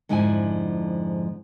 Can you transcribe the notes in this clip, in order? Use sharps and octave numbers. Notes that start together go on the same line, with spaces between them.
F2 G#2 D3 F3 E4 G#5